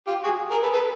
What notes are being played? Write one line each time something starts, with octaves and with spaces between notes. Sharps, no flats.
F4 G4
F#4 G#4
G#4 A#4
A4 B4
A4 B4